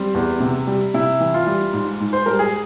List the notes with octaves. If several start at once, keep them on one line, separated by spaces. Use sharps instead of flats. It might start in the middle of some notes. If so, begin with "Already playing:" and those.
Already playing: G3 C4
E2
C3
G3
C3 E4
E3
F4
G3
G#2
G#2
C5
G3 A#4
G#4